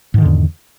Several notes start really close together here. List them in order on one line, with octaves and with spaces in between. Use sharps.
G#2 D#3 D3 E2